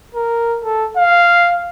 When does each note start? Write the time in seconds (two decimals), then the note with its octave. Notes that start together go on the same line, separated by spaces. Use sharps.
0.15 A#4
0.64 A4
0.97 F5